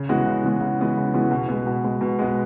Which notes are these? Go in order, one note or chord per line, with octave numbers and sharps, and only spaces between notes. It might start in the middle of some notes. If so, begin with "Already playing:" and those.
Already playing: C#3
E3 G#3 B3 F#4
C#3
E3 G#3 B3 F#4
C#3
E3 G#3 B3 F#4
C#3
E3 G#3 B3 F#4
B2
G#3 B3
B2
G#3 B3
B2
G#3 B3